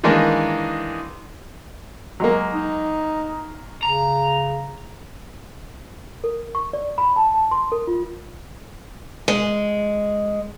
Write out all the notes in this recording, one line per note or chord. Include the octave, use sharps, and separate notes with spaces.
D#3 E3 G#3 A#3 D4
F#3 G#3 A#3
D#4
C#3 A#5
A#4
C#6
D5
B5
A5
A5
C6
A#4
F4
G#3